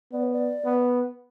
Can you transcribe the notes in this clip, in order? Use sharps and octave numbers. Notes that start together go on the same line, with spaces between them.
B3 D5
C#5
D5
B3